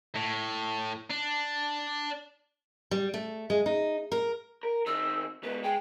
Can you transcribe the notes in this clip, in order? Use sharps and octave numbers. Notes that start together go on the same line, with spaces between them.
A2
D4
G3
A3
G#3
D#4
A#4
A#4
D#3 C4 E6
G#2 B3 B4
G#3 G5